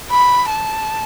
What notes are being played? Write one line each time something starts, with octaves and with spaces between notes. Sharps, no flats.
B5
A5